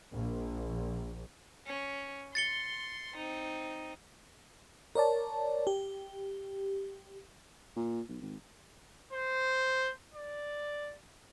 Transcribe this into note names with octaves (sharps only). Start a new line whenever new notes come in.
A#1
C#4
C6 A6 C#7 G7
C4 D#4
A#4 C#5 D5 A5
G4
A#2
B1
G#1
C5
D5